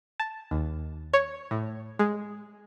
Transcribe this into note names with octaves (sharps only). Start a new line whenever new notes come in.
A5
D#2
C#5
A2
G#3